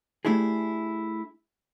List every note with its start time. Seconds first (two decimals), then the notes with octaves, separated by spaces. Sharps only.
0.25 A3 D4 E4 G4 G#4